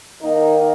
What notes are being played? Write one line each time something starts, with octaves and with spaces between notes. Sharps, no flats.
D#3 A#3 D#4